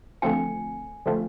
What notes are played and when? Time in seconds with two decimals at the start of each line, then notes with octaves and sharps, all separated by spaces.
0.22 D3 F3 A3 C4 F4 G#5
1.06 D3 F3 A3 C4 F4